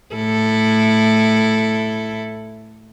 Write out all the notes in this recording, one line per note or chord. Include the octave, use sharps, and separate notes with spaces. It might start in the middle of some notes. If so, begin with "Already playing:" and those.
A2 E4 A4